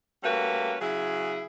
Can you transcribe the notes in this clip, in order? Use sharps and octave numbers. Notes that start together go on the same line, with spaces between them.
G3 A3 A#3 C#4 F#4 B4
C#3 F#3 E4 G#4